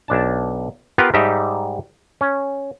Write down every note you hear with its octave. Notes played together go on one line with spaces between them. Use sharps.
B1 D4 A5
B3 F4 G4 A#4 B4 F5
G#2 G3 D#4 G4 E5
C#4